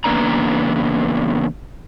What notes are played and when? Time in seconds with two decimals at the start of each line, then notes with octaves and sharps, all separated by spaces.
0.04 E2 C#3 A#3 B3 D4 A#5